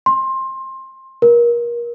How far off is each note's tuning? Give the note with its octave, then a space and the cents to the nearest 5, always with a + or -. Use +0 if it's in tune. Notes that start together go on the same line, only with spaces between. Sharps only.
C6 +20
A#4 +30